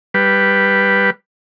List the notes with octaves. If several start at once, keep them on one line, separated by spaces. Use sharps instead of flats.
G3 B4